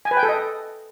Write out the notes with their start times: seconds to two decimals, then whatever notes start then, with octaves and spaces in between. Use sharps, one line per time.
0.05 G#5
0.11 B4
0.17 G5
0.23 A4
0.29 D#5